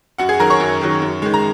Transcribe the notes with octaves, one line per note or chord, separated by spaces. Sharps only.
F#2 F#4 F#5
G#4 G#5
D#3 F#3 A#4 A#5
C#5 C#6
F#2
D#3 F#3
F#2
D#3 G#3
A#5